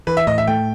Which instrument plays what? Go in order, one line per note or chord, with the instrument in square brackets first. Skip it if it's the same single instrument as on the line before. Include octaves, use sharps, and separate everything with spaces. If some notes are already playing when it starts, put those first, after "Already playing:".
[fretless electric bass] E3 [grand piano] B4
[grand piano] E5
[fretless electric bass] A2 [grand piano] D#5
[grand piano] E5
[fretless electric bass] A3 [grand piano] G5